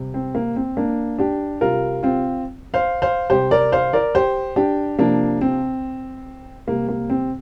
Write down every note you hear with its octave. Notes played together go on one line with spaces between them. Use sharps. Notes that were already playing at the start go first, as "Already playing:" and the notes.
Already playing: C3 G3
C4
A#3
C4
A#3 D4
D4 G4
C3 G3 F4 A#4
C4 F4
C5 F5
C5 F5
C3 G3 G4 C5
A#4 D5
C5 F5
A#4 D5
G4 C5
D4 G4
C3 F3 A#3 D4
C4
C3 G3 A#3
A#3
C4